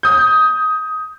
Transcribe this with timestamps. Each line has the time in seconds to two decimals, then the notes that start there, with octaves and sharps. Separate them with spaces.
0.03 D#6 G6